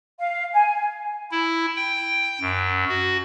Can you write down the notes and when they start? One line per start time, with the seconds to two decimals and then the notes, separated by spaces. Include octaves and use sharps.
0.20 F5
0.53 G#5
1.31 E4
1.76 G5
2.41 F#2
2.89 F#4